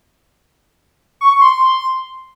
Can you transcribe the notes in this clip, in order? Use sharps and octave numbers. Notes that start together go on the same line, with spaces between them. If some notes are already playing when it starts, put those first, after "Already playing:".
C#6
C#6
C6